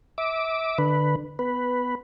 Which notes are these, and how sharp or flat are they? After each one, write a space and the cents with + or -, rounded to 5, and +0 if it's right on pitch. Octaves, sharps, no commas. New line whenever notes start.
E5 -30 D6 +0
D3 +20 B4 +0
B3 +10 B4 +0